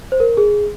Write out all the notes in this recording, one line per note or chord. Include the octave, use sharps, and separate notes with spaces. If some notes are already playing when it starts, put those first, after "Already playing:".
C5
A#4
G#4